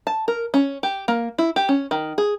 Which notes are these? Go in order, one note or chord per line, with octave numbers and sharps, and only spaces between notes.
A5
A#4
C#4
G4
A#3
E4
G4
C#4
D#3
G#4